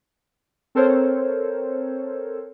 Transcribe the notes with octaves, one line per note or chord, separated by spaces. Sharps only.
C4 A4 A#4 C5 C#5